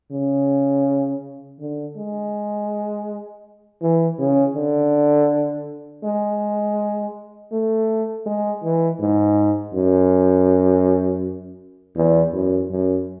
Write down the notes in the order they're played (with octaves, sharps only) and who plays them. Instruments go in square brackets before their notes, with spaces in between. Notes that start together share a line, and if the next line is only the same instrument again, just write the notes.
[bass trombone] C#3
D3
G#3
E3
C#3
D3
G#3
A3
G#3
E3
G#2
F#2
E2
F#2
F#2